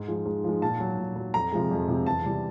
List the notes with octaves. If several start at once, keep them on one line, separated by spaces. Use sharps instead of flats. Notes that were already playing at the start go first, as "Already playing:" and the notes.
Already playing: G#2
F3 G#3
G#2
F3 G#3
A#2 A5
F#3
A#2
F#3
F2 A#5
C3 F3 G#3
F2
C3 F3 G#3
E2 A5
C3 E3 G3